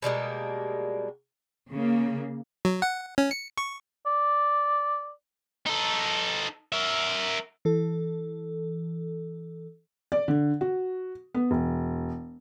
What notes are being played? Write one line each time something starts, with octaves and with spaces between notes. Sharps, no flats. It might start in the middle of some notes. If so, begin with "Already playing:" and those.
B2 G3 G#3 A#3
C#3 A#3
F#3
F#5
C#4
C#7
C#6
D5
D#4 A4
A#4 E5
E3 A4
D5
D3
F#4
B3
E1